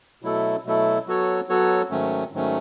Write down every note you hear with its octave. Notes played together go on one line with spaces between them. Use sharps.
B2 F#3 A3 E4 A4
B2 F#3 A3 E4 A4
F#3 B3 F#4 A4 C#5
F#3 B3 F#4 A4 C#5
G#2 D#3 F#3 A3 C#4
G#2 D#3 F#3 A3 C#4